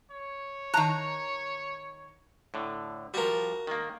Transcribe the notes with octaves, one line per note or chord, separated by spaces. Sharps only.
C#5
D#3 A5 A#5 F#6
A2 D3
F3 G3 F#4 A#4
D#3 A#3